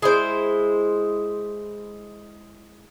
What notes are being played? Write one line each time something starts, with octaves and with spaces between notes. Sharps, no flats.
G#3 E4 C5